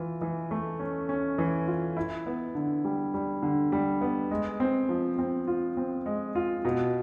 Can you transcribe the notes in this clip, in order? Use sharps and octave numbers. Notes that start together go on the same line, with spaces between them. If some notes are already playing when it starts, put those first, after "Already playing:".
Already playing: E3 F4
E3
A3
C#4
C#4
E3
F4
E4
B3
D3
G3
G3
D3
G3
B3
G#3
C4
F3
C4
F4
C4
G#3
F4
B2